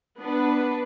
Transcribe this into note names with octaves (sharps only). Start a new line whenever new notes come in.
B3 D4 B4